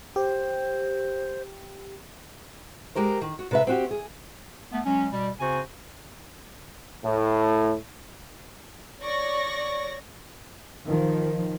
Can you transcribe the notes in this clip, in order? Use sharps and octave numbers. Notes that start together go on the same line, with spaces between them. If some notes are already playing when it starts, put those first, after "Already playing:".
G4 C5
G#3 G4 A#4 C5
D#3
F#4
C3 B4 E5
C4 F#4 G4
G#4
A3 B3
F#3 G#3 C#4
B2 G3
C#3 C4 F#4 C5 G#5
A2
C#5 D5 C#6 A#6
D#3 F3